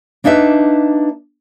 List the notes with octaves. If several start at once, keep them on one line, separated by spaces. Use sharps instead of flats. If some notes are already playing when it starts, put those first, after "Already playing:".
A#3 D4 D#4 B4 E5